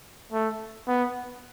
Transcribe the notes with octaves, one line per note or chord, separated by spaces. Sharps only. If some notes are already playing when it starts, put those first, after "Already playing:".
A3
B3